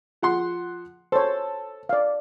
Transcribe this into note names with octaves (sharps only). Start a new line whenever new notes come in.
F3 F#5 C6
A4 C5 C#5
D5 F5